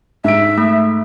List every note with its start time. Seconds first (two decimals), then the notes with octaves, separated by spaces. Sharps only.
0.24 G#2 E5 D7
0.58 A3